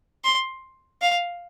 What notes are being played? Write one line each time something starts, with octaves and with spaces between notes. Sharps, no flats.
C6
F5